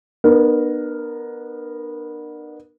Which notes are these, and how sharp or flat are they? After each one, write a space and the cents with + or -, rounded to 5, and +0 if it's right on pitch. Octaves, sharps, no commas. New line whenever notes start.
B3 -15 D4 +45 A#4 +0